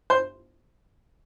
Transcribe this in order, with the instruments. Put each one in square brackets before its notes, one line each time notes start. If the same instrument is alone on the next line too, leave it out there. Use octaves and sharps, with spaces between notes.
[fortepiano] C5